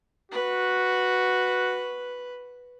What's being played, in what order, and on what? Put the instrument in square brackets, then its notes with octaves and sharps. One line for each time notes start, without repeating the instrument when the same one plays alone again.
[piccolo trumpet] F#4 [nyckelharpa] B4